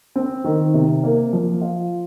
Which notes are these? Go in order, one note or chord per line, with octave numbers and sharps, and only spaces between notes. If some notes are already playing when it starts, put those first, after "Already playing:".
C4
D#3
C3
A#3
F3
F4